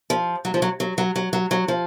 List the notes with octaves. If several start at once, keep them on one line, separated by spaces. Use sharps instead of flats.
F3
F#3
F3
F#3
F#3
F#3
F#3
F#3
F#3
F3